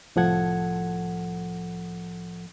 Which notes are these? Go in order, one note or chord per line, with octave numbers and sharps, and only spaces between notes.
C2 A2 F3 A4 F#5 G#6